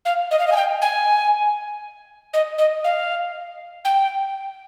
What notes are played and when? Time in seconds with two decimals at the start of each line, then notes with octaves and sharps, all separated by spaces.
0.05 F5
0.31 D#5
0.39 F5
0.47 D#5
0.52 G#5
0.56 G5
0.82 G#5
2.34 D#5
2.58 D#5
2.84 F5
3.85 G5